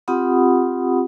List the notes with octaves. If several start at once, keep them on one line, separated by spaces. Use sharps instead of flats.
C4 F4 G4 F#5 B5 D#6